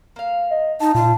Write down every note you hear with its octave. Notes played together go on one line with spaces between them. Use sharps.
A#3 F5
D#5
D#4 A5
A#2 F4 A5